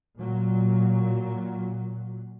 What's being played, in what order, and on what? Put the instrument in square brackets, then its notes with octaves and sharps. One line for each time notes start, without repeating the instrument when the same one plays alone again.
[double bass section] A#2 F#3